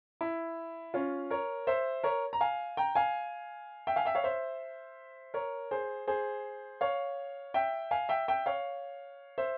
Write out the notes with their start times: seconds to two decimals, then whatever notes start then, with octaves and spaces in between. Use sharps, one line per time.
0.21 E4
0.94 C#4 F4
1.30 A#4 C#5
1.67 C5 E5
2.03 A#4 C#5
2.33 A#5
2.41 F5 G#5
2.77 G5 A#5
2.95 F5 G#5
3.87 E5 G5
3.96 F5 G#5
4.05 E5 G5
4.15 C#5 F5
4.24 C5 E5
5.34 A#4 C#5
5.71 G#4 C5
6.07 G#4 C5
6.81 C#5 F5
7.54 E5 G5
7.91 F5 G#5
8.09 E5 G5
8.28 E5 G5
8.46 C#5 F5
9.38 C5 E5